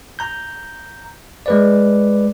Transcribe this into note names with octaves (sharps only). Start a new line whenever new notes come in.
A#5 G6
G#3 B4 D5